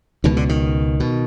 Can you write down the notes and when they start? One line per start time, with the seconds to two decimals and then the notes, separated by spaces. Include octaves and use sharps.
0.24 C#2 B2 D#3
0.37 D3
0.49 D#3
1.00 B2